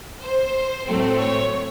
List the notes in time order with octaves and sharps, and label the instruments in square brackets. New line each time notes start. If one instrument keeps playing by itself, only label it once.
[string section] C5
A2 F#3 A3 C4
C#5